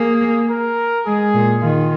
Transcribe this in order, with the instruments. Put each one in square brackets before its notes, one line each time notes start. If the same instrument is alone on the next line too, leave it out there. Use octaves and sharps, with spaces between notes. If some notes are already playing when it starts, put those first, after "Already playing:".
Already playing: [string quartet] A#3 [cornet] G#4
[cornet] A#4
[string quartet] G#3 [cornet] G#4
[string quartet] A#2
[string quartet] D#3 [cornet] F4